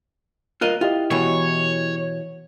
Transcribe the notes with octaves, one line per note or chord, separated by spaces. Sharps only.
F4 A#4 D#5 F#6
E4 F4 G4 D#5
B2 E3 C#5